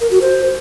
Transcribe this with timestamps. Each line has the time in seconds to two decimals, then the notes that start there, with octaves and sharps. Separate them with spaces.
0.01 A#4
0.11 F#4
0.21 C5